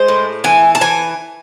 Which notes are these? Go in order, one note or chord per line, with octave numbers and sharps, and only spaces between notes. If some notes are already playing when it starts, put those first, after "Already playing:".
Already playing: G#3 C5
A2
E3 G#5
A5
E3 G#5